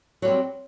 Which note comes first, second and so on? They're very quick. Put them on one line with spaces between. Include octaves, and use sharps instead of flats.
F#3 G3 C4